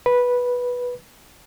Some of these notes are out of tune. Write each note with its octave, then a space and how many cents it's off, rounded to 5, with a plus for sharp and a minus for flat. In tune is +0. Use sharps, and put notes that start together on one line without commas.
B4 -10